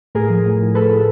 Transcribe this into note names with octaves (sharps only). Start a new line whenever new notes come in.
A2 G#4 A#4
F3
A2
A2
A2 A4 B4
A2